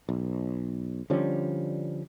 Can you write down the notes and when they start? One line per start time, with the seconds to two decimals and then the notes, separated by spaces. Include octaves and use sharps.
0.09 B1
1.10 D3 F3 G3 C#4